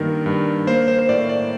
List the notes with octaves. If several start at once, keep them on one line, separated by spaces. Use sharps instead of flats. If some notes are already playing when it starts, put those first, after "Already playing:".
Already playing: G2 D#3 A#3 A#4
G2
A#3 C5
C5
C5
A2 D5
D5